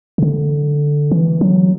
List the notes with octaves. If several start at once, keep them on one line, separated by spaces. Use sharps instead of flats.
C#3
D3
E3
F#3